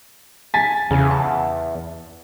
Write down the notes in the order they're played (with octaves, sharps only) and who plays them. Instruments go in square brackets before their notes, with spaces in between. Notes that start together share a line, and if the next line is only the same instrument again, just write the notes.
[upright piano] G#5 A6 B6
[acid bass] E2 [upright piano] C#3
[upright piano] A5